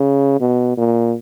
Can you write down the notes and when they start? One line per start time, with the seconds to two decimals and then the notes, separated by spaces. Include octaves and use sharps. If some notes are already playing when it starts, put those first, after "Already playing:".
Already playing: C#3
0.40 B2
0.77 A#2